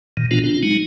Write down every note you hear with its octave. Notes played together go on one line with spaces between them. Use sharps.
A#2 D#3
B2 D#3 F3 B3 D4 F4
C4 D4 F4
F#3 G#3 D#4